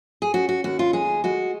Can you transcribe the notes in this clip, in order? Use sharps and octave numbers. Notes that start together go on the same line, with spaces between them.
G#4
C#4 F#4
F#4
D#2 F#4
F4
G#3 G#4
G#3 F#4